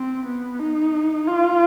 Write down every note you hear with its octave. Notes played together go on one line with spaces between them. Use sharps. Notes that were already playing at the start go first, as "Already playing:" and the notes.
Already playing: C4
B3
D#4
F4